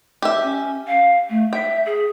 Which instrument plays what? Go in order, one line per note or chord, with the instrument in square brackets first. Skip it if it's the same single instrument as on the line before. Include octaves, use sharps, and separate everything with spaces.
[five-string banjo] G4 E5
[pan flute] C#4
F5
A3
[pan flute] E5 [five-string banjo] G5
[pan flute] G#4